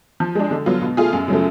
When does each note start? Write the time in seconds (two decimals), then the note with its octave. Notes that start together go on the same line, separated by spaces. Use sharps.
0.20 F3
0.35 G#3 D4
0.51 D3
0.66 F#3 B3 F4
0.82 B2
0.97 A3 F4 G#4
1.13 F#2
1.28 C#3 F#3 A3